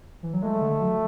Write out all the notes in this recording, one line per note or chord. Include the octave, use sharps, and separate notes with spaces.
E3
F#3
G#3 A3
D3
F#3